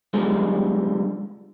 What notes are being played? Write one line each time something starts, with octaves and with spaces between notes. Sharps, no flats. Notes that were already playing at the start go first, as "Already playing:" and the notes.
B1 G2 D3 F3 G3 G#3